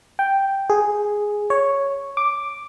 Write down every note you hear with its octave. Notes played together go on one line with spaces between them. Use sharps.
G5
G#4
C#5
D6